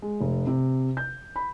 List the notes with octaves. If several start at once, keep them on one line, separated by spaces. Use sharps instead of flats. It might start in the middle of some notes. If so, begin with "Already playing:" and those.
G#3
F1
C3
G6
B5